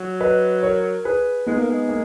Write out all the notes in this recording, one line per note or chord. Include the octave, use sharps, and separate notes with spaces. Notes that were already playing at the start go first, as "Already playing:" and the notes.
Already playing: F#3
B4 D#5
A#4 C#5
G#4 B4
G#3 B3 D#4
A#3
G#3
A#3